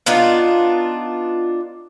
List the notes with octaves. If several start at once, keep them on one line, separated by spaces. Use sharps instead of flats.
B3 D4 D#4 F4